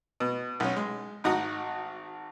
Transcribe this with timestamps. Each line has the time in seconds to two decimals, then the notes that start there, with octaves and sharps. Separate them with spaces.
0.20 B2
0.60 B1 C#4
0.76 G#3
1.24 G#1 D#4 F#4 A#5 D#6